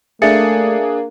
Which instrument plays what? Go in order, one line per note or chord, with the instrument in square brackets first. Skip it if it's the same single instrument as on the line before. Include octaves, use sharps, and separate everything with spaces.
[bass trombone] A3 [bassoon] A#3 [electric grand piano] D4 G#4 [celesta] E5 A6 C#7